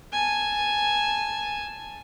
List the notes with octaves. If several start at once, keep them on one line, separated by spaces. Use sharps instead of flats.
G#5 A5